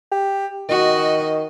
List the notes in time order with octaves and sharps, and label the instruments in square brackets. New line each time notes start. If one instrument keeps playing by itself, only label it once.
[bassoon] G4
[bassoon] D#3 [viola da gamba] F#4 D#5